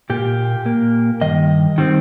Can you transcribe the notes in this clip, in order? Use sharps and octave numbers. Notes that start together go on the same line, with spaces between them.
A#2 A#3 G4
A#2 A#3
G2 D#3 D#5
D#3 G3 C4